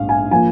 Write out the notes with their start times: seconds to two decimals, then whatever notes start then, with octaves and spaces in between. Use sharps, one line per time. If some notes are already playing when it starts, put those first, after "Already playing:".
Already playing: A#1 G#2 F5
0.09 G#5
0.31 F3 A#3 G#5